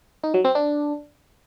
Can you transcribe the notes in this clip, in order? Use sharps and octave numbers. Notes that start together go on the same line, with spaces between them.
D#4
F#3
C4
D4